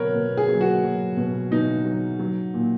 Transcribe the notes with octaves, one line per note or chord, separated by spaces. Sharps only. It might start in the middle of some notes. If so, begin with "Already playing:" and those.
Already playing: B2 F#3 A#4 B4 C#5
B2
G#4
F#3
F#4
F#3
B2
B2 D#4
F#3
F#3
A#2